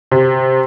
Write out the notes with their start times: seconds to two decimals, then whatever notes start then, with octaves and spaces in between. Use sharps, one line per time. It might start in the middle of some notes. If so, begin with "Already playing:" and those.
0.12 C3